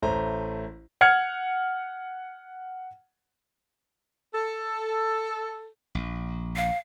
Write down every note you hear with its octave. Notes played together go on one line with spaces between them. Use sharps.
A1 A3 C5 A#5
F#5 F6 G#6 C#7
A4
A#1
F5